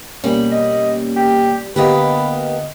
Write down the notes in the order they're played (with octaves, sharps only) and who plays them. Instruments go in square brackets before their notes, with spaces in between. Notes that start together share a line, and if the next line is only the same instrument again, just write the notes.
[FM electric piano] B2 A#3 C#4 [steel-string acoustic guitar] G3
[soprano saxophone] D#5
G4
[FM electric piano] D3 D#5 [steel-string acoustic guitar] A#3 B3 G4 [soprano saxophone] B4